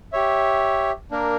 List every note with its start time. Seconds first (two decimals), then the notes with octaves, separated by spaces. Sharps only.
0.12 G4 C#5 E5
1.11 A#3 D4 A#4